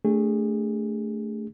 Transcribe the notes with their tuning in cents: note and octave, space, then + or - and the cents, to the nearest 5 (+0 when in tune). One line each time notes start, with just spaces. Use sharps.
A3 +0 D4 -15 G#4 -30